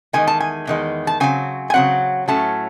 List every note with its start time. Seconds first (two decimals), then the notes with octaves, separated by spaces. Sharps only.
0.13 E2 D#3 G#3 G#5
0.27 A5
0.40 G#5
0.67 E2 D#3 G#3
1.07 A5
1.20 C#3 F#3 C4 G#5
1.70 G#5
1.74 C#3 F#3 C4 F#5
2.28 A2 F#3 A3 C#4 A5